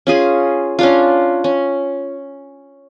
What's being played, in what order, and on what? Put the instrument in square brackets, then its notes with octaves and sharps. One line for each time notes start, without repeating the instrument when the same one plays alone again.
[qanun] C#4 F4 G#4
C#4 D4 F4
C#4